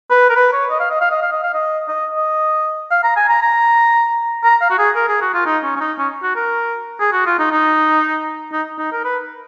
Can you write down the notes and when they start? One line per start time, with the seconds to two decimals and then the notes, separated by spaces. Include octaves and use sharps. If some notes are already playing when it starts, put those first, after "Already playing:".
0.10 B4
0.30 A#4
0.36 B4
0.53 C#5
0.70 D#5
0.80 F5
0.90 D#5
1.01 F5
1.11 D#5
1.22 F5
1.32 D#5
1.43 F5
1.54 D#5
1.88 D#5
2.15 D#5
2.91 F5
3.04 A#5
3.16 G#5
3.29 A#5
3.42 A#5
4.44 A#5
4.61 F5
4.70 F#4
4.78 G#4
4.95 A#4
5.08 G#4
5.21 F#4
5.34 F4
5.46 D#4
5.63 C#4
5.76 C#4
5.80 D#4
5.98 C#4
6.23 F#4
6.36 A#4
7.00 G#4
7.13 F#4
7.26 F4
7.39 D#4
7.52 D#4
8.53 D#4
8.78 D#4
8.92 A#4
9.04 B4